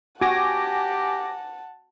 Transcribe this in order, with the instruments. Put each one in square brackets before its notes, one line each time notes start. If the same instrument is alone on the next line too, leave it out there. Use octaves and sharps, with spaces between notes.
[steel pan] F#4 [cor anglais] G4 [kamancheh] F#5 A5 [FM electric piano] G#5 D6 A#6